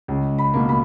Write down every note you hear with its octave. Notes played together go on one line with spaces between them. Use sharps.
C#2
B5
B2 A#3
B5